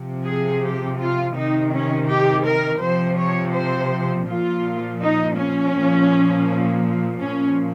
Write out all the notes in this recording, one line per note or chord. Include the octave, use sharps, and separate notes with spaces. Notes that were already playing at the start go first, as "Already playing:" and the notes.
Already playing: C3 F3
G#4
G4
F4
C3 D#3 D#4
C#4
G4
A#4
C3 F3 C5
C#5
C5
A#2 F3 F4
D#4
C#4
A#2 F3
A#2 F3 C#4